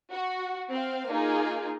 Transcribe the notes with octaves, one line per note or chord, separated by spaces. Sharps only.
F#4
C4 F5
A#3 D#4 F4 G#4